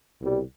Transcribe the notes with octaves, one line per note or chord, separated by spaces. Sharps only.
C2 B2 G3